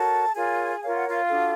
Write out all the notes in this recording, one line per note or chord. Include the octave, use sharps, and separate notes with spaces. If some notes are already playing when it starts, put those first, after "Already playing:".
Already playing: F#4 A4 A#4 C#5 A5
F4 G#4 A#4 C#5 G#5
F4 A#4 C#5 F5
F#5
F4 F5
D4 F#4 A4